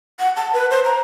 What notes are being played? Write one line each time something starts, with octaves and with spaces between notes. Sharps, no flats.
F#5
A5
B4
C5
A#5